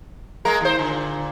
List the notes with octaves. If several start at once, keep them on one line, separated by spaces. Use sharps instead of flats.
G#3 A#3 A#4
D#2 C5
A#2 D3